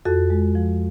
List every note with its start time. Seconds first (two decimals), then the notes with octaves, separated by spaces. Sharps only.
0.05 F2 F#4 A4
0.30 G#3
0.55 F3